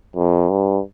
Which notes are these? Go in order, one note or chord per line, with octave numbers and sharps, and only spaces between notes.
F2
G2